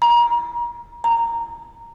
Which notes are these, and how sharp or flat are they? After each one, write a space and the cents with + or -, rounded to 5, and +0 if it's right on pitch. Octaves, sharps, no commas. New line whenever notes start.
A#5 +35
A#5 -10